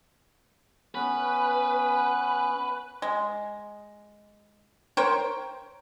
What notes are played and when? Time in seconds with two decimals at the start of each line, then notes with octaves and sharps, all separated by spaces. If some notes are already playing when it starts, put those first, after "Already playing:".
0.95 B3 C#4 B4
3.02 G#3
4.97 A#4 C5 C#5 G5